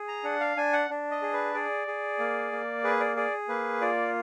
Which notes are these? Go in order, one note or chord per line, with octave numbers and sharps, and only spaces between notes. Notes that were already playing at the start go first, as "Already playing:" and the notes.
Already playing: G#4
A#5
D4 F#5
F5
D4 G#5
F#5
D4
D#5
G#4
B4
G#4 D5
G#4
A#3
A#3
G#4 B4
D5
G#4 D5
A#3 B4
F4 D5